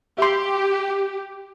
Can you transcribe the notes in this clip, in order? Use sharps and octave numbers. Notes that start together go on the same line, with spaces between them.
G4 E5 C6